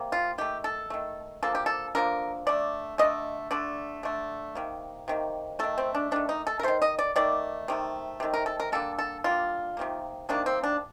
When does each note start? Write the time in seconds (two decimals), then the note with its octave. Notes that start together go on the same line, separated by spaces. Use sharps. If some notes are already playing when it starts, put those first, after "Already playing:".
Already playing: C3 G3 A#3
0.12 F4
0.38 D#3 A3 G4
0.64 A4
0.90 D#3 A3
1.43 D3 F3 A#3 A4
1.55 G4
1.66 A4
1.95 D3 F3 A#3 A#4
2.47 D3 A3 D5
2.98 D3 A3 D#5
3.51 D3 A3 D5
4.03 D3 A3
4.55 C3 D#3 A#3
5.08 C3 D#3 A#3
5.59 D#3 A3 A4
5.78 C4
5.95 D4
6.11 D#3 A3 D4
6.29 D#4
6.47 A4
6.59 A#4
6.63 D#3 A3 C5
6.82 D#5
6.99 D5
7.16 D#3 A3 D5
7.68 C3 D#3 A3
8.20 C3 D#3 A3
8.34 A#4
8.46 A4
8.60 A#4
8.72 D3 G3 A#3 A4
8.99 A4
9.24 D3 G3 A#3 F4
9.77 C3 D#3 G3 A#3
10.29 C3 D#3 G3 A#3 D4
10.46 C4
10.64 D4